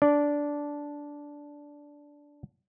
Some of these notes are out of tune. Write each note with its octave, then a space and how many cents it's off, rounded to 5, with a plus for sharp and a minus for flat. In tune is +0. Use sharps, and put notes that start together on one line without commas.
D4 -10 D5 -10